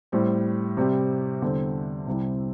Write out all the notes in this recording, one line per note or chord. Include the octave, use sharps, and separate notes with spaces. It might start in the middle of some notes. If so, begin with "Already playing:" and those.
A2 G3 C4
C3 G3 C4 G4
E2 D3 G3 C4
C2 C3 G3 C4 E4